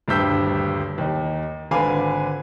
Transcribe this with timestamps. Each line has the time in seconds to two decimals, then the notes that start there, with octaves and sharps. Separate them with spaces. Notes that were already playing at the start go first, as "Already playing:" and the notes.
0.08 D#1 D2 G2 E6 G6 B6
0.98 D#2 D#4
1.71 G#1 D3 B4 F5 G#5 D6